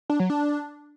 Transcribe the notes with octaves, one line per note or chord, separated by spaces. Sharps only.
D4
F#3
D4